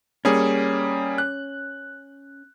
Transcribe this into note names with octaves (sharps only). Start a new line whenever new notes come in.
G3 A#3 C#4 G#4
F#6